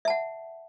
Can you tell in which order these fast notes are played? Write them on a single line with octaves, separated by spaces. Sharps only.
E5 A5 F#5